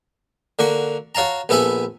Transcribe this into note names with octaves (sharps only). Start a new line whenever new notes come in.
D3 A#3 F#4 C#6
F#4 C#5 F5 A5 A#5
A#1 B3 A4 E5 G#5 B5